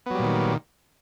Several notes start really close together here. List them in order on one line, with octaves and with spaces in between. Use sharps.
B3 F#3 G3 A#2 D#3